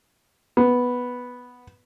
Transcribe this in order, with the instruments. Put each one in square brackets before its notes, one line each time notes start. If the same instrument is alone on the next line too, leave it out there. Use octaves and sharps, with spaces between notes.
[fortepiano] B3